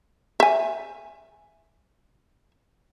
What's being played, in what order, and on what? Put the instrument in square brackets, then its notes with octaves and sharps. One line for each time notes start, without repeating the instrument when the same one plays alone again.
[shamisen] E5 G#5